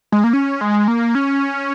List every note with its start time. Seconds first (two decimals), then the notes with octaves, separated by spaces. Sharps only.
0.12 G#3
0.24 A#3
0.33 C#4
0.61 G#3
0.88 A#3
1.15 C#4